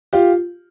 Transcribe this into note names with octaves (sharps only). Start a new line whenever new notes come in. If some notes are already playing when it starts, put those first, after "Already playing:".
F4 G4